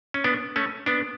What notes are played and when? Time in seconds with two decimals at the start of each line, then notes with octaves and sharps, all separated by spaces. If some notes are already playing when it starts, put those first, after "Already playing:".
0.14 C#4
0.24 B3 D4
0.56 A3 C#4
0.86 B3 D4